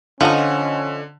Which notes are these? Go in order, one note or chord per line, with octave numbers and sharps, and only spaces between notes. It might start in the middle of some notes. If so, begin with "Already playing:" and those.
D3 F3 C#4 D#4 D#5 F#5 G#5